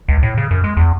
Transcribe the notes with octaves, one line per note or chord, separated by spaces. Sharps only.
C#2
A2
C#3
F#2
G#3
E2